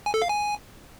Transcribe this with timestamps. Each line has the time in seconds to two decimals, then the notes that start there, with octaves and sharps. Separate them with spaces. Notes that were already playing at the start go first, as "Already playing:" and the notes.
0.06 G#5
0.14 A4
0.22 F5
0.29 G#5